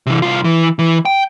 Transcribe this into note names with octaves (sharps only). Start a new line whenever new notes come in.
C3 E3
C2 F4
E3
E3
G5